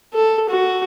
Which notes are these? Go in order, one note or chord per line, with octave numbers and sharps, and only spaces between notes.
A4
F#4